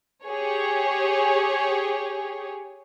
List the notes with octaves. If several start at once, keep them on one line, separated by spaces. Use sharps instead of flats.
G4 G#4 C#5